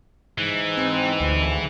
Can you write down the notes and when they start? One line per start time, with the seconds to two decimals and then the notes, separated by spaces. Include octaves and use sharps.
0.38 G#2 E3
0.77 C4
1.21 D2